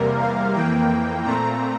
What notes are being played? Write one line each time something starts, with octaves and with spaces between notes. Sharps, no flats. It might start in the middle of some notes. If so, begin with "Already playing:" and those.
Already playing: E2 C3 G3 A#3 A#4
F5
F2 E3 A#3 G5
A#2 A3 C4 A#5